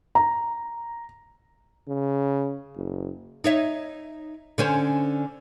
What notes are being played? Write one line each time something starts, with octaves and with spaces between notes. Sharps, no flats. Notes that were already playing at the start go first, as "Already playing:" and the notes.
A#5
C#3
F#1
D#4 C#5 E5
D3 C#4 C5